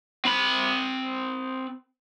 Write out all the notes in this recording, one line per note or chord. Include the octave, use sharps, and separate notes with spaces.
C4 B5